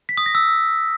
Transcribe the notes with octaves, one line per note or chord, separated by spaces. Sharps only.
B6
D#6
A#6
E6